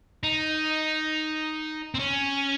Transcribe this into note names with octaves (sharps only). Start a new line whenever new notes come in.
D#4
C4
C#4